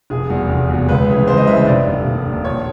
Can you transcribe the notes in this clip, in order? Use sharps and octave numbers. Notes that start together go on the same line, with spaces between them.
F1 G#4
E2 B2
F1
E2 B2
C#2 B4
C#3 E3
C#2 C5
D#5
C#3 E3 E5
E5
F1 D5
D#2 D3
F1
D#2 D3
A#1 C#5